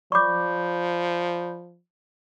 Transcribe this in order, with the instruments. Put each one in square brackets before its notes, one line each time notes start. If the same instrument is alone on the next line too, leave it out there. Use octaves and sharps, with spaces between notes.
[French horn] F3 [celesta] D5 B5 G6 [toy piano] C#6 D6